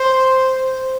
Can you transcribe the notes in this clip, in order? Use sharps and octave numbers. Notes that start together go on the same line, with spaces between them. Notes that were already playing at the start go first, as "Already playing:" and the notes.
Already playing: C5